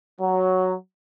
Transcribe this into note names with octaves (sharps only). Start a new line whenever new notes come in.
F#3